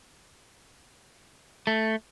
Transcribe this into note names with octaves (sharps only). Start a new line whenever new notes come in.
A3